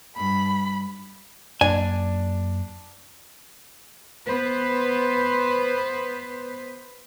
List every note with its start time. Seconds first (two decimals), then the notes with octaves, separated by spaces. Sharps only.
0.17 G2 B5
1.61 F#2 A#3 D4 G#5
4.25 B3 B4 C5